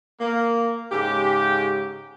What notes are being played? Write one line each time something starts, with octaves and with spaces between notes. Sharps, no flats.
A#3
G#2 C#3 G4